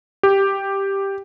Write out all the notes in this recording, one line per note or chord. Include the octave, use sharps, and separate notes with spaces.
G4